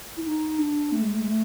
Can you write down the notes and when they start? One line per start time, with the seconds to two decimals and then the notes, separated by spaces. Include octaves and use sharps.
0.17 E4
0.23 D#4
0.58 D4
0.92 A3
1.02 G#3
1.11 A3
1.20 G#3
1.26 A3